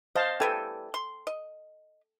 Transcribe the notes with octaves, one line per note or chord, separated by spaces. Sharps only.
C5 D#5 F5 A5
E3 G3 B3 A4 G5 G#5
C6
D#5